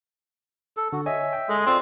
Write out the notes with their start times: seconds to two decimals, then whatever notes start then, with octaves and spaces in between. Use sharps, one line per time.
0.77 A4
0.93 D3 F#4
1.06 C#5 D#5 E5 G#5
1.33 G5
1.49 G#3 A4
1.66 C4 F4 D5 C6